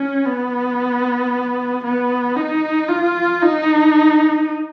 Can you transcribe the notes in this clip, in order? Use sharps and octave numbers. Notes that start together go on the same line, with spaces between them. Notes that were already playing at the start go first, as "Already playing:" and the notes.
Already playing: C#4
B3
B3
D#4
F4
D#4